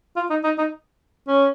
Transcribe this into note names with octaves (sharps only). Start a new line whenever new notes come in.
F4
D#4
D#4
D#4
C#4